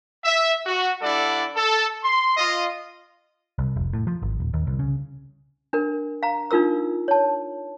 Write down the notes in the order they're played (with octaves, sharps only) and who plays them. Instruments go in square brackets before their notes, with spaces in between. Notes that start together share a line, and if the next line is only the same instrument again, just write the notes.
[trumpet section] E5
F#4
G3 D4 E4 A4 D5 F#5
A4
C6
F4 D#5
[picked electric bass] C2
F1
A2
F3
G#1
D#1
D#2
C2
C#3
[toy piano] D4 A#4
F5 A#5
D4 D#4 F4 A#4 E6
C#5 A5